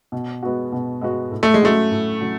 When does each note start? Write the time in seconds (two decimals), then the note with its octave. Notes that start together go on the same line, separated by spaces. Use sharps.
0.12 B2
0.43 G#3 B3 F#4
0.72 B2
1.01 G#3 B3 F#4
1.32 A2
1.43 A3
1.54 G#3
1.62 F#3 A3 C#4 F#4
1.91 A2
2.21 F#3 C#4 F#4